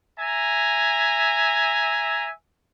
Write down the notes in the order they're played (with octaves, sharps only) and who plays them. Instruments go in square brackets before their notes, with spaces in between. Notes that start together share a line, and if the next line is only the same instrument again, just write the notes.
[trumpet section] E5 G#5 A#5